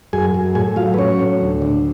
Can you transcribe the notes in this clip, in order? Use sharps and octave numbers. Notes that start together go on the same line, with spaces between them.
F#2 G#4 G#5
F#2
A2 G#4 G#5
F#3 F4 F5
B4
F#3 C#4 C#5
A2
D2
D3